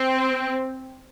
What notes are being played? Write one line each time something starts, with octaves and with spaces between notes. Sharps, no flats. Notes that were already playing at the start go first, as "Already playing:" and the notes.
Already playing: C4